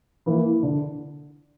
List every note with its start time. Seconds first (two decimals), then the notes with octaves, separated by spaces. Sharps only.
0.26 E3 A#3 E4
0.63 D3